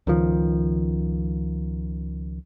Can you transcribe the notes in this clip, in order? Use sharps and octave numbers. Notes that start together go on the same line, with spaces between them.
C#2 D#3 F3